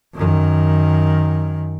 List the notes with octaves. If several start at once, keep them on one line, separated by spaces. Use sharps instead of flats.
F#2 D#3